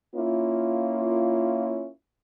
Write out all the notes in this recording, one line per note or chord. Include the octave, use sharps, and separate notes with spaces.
A#3 C#4 E4 F4